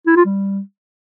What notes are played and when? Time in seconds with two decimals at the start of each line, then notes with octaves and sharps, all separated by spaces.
0.07 E4
0.16 F4
0.25 G3